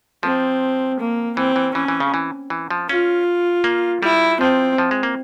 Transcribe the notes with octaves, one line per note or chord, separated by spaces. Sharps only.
F3 C4
A#3
E3 C4
E3
E3 C#4
E3
C#3
E3
E3
F3
C#4 F4
A#3
G3 E4
F3 C4
F3
G#3
A#3